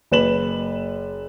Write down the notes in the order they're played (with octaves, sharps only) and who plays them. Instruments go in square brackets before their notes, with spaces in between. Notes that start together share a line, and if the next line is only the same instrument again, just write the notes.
[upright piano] F#1 B4 E7 F#7